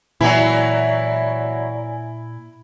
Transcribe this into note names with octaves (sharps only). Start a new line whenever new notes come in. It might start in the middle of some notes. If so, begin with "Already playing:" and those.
A#2 E3 F#3 E4 D5 G#5 A#5